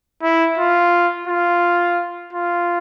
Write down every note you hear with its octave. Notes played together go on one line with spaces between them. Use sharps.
E4
F4
F4
F4